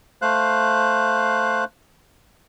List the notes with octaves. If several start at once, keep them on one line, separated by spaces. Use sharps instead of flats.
A3 C5 F5 F#6